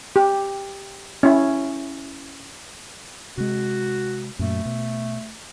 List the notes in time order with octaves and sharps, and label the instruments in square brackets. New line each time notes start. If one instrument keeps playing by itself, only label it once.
[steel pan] G4
C#4 E4
[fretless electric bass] C3 G#3 [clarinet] F#4
[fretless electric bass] F#2 A#2 [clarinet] A3
[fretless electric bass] B2